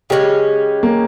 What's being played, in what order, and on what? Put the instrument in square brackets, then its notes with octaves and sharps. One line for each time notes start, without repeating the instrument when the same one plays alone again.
[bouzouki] C#3 G#3 C#4 [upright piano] G4
[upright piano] A#3